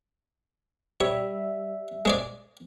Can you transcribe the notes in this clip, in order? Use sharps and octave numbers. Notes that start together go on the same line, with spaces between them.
G3 C#5 E5
G#3 C#5 D5